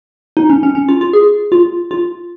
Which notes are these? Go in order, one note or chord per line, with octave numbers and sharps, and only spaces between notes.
D#4
C#4
C#4
C#4
F4
F4
G#4
F4
F4